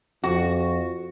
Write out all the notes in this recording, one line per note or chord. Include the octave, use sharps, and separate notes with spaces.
F2 F#4